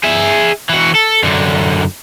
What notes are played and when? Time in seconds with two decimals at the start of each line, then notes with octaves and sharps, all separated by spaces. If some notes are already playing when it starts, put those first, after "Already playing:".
0.04 G#4 E5
0.69 E3 F#4
0.95 A4
1.24 F#2 D3